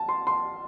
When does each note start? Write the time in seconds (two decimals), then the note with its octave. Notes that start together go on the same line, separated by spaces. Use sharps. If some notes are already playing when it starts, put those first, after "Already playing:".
Already playing: A5
0.09 C6
0.27 C6